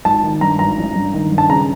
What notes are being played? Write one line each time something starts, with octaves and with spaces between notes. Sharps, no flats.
G#1 A5
D#3
G2 A#5
G#1 A#5
A1
G2
D#3
G2
A5
C#3 A#5